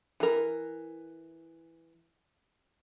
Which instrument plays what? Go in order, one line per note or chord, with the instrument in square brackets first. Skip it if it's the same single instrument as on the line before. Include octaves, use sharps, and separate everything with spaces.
[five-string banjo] E3 A#4